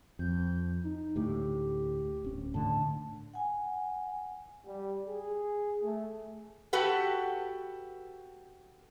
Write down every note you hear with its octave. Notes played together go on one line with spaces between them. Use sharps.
F2 G6
D#4
D2 A2 G4
D1 C#4
A2 D3 A5
F#5 G#5
G3
G#4
A3
F#4 G4 A4 B4 F#5